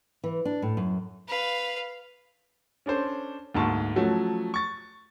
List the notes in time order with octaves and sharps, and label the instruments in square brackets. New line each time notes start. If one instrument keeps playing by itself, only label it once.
[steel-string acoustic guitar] E3
D4
A2
F#2
[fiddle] B4 F5
[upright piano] C#4 D4 A4 C5
D2 G#2 A#3 A5 C#6
F3 F#3 A3 C#4 F#4
C#6 A6